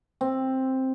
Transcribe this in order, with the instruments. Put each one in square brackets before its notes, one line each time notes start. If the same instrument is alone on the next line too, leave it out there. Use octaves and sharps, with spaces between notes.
[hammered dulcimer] C4